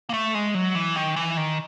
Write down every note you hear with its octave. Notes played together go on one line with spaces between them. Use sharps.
A#3
A3
G#3
F#3
E3
D#3
E3
D#3